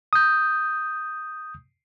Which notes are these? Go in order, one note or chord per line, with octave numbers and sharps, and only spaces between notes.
D#6 G6